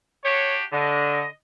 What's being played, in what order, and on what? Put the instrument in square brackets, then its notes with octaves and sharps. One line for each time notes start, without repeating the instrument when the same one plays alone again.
[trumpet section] D4 F#4 G4 [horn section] C#5
[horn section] D3 D4 [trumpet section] D#5